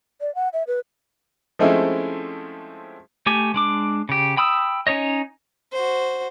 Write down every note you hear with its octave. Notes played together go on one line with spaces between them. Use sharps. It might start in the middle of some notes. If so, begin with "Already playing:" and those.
D5
F#5
E5
B4
F3 G#3 A3 C4 C#4 E4
A3 G4 G#5
G#3 D4 D6
C#3 G4
G5 B5 D#6 E6
C#4 D#4 C#5 D#5
F#4 C5